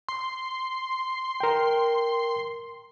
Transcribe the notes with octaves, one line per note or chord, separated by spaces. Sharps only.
C6
A#4 G5